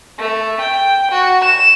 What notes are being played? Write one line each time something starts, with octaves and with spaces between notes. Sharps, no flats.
A3
G5
F#4
E7